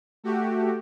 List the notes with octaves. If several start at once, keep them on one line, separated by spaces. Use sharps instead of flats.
A3 F#4 G4